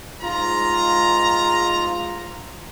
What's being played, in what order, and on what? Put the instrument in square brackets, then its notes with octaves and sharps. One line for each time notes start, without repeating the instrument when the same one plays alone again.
[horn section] G#2 A#5 [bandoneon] F4